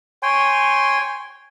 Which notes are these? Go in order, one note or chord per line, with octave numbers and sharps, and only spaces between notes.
C#5 G5 G#5 C6